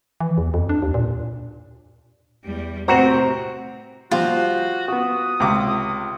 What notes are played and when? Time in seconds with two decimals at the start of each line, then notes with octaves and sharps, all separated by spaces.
0.20 E3
0.38 E2
0.54 F2
0.69 D4
0.82 D#2
0.94 A#2
2.44 E2 G3
2.88 A2 C3 C4 F#4 C5 F#5 A#5
4.11 F3 G3 F4 F#4
4.88 B3 F#4 D#6
5.40 C#2 C3 D6